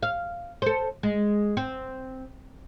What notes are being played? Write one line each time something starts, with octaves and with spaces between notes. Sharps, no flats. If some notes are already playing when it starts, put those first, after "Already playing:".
F5
A4 C5
G#3
C4